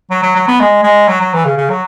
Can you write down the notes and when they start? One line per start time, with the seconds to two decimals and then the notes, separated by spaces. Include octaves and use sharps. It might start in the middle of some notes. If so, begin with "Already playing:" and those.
0.10 F#3
0.23 F#3
0.35 F#3
0.48 B3
0.60 G#3
0.83 G#3
1.08 F#3
1.21 F#3
1.33 E3
1.45 C#3
1.58 C#3
1.70 F#3